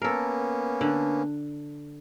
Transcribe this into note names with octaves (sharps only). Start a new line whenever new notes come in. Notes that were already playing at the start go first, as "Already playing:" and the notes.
A#3 B3 C#4 A4 A#4
D3